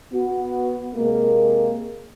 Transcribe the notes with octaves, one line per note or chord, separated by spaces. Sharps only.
B3 F#4
C3 G#3 A#3